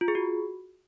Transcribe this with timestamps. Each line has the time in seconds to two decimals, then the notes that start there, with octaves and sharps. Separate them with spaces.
0.01 F4
0.08 G#4
0.15 F#4